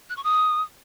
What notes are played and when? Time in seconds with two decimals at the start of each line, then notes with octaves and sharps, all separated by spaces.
0.10 F#6
0.17 C#6
0.24 D#6